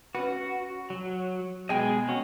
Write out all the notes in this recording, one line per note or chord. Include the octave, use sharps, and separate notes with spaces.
C#4 F#4 B4
F#3
B1 B2 G#3 G#4 D#5 G5
C#4 F#4